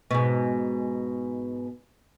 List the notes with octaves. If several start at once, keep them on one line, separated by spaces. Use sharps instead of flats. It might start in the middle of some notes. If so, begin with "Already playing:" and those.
G#2 B2